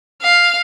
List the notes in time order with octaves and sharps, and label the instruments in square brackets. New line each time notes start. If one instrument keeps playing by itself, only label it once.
[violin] F5